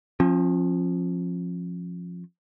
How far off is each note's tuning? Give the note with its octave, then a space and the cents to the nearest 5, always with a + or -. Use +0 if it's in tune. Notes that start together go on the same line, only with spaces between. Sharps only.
F3 +10 C#4 -40